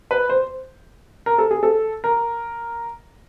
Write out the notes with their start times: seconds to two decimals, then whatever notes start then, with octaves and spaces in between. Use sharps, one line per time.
0.11 B4
0.30 C5
1.26 A#4
1.38 A4
1.51 G#4
1.63 A4
2.04 A#4